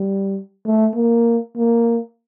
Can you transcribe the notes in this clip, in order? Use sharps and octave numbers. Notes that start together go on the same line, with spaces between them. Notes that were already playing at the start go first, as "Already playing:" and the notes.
Already playing: G3
A3
A#3
A#3